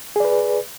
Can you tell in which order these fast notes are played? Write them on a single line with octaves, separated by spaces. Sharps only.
G#4 D5 B4